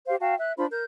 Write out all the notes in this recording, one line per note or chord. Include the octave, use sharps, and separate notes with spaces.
G4 C5 F5
F#4 F5 G5 A5
E5 F#6
D4 F4 C5 B5
A#4 G6